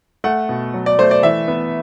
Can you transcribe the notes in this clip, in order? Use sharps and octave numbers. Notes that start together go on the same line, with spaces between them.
A3 F#5
B2
F#3
D5
A3 C5
D5
E3 E5
B3